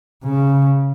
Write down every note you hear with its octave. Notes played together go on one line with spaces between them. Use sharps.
C#3